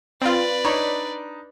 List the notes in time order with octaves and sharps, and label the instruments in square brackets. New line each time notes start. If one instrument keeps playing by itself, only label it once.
[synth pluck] C4 F4 [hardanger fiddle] B4 D5
[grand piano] D4 D#4 B5 [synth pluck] C#5